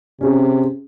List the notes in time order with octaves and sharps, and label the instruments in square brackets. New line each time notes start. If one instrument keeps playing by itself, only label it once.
[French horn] C3 [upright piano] C#4 G#4